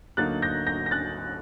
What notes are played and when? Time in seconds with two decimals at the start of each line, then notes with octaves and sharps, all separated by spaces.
0.17 D2 D3 F#3 A#3 D#4 F#6 A6
0.42 G6 A#6
0.67 G6 A#6
0.86 A#6
0.91 F#6 A6